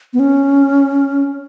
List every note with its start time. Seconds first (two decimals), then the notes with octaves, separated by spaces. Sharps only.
0.13 B3
0.19 C#4